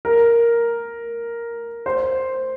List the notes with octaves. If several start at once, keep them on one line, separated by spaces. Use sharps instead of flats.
A#4
C5